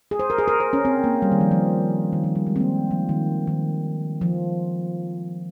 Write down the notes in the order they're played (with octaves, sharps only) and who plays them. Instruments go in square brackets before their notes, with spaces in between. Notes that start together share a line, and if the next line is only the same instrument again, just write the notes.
[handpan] G#4
C5
A#4
G#4
A#4
C5
C#4
C4
A#3
G3
D#3
F3
F3
D#3
F3
G3
G#3
C4
A#3
F3
D#3
D#3
F3